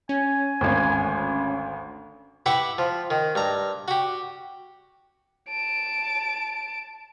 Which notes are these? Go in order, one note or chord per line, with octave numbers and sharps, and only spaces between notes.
C#4 G#5
G#1 D2
E4 G4 B4 F#5 C#6
F3
D#3
G2 A#5
F#4 G4
A5 D7